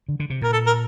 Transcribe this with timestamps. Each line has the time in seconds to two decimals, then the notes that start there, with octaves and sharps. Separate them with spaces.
0.08 D3
0.20 D3
0.30 C3
0.42 A#2 A#4
0.53 A4
0.67 A#4